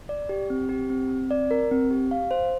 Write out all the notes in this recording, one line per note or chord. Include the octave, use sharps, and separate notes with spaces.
D5
G4
C4
G4
C4
C4
D5
A#4
C4
G4
F5
C5